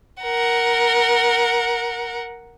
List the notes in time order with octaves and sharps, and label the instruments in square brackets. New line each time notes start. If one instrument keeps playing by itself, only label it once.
[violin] A#4 F#5